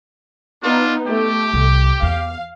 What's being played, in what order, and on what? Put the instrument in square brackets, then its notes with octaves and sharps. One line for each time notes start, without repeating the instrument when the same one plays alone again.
[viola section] B3 D#4 [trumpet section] D4 F4
[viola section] A3 [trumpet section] G4
[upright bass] C2
[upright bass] E2 [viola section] F5